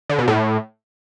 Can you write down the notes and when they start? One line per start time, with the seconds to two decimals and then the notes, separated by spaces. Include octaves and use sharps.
0.09 D3
0.18 B2
0.28 A2